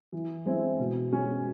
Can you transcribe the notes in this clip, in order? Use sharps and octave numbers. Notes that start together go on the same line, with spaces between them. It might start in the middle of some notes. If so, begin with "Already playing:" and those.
E3
G#3 C4 E4
B2
G#3 C#4